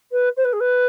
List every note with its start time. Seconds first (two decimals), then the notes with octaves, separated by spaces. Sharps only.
0.12 B4
0.37 C5
0.45 B4
0.53 G#4
0.60 B4